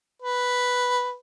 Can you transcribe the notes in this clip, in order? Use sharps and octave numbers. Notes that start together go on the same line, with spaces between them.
B4